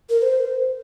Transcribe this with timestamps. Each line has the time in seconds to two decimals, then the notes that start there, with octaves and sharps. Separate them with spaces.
0.10 A#4
0.22 C5